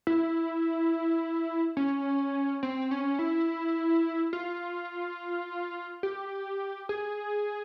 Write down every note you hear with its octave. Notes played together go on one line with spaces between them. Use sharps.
E4
C#4
C4
C#4
E4
F4
G4
G#4